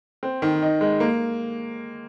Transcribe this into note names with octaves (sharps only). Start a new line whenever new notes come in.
C4
D#3
D#4
G#3
A#3